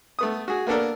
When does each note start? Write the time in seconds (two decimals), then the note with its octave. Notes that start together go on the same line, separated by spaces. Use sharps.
0.19 A3 B3 D#6
0.48 F#4 G#4
0.67 A#3 B3 D4 A4 A#4